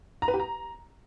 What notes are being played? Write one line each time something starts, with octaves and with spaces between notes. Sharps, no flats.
A#5
B4
G4
A#5